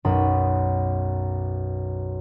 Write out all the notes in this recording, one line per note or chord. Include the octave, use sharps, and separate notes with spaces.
B1 F#2 B5 D#6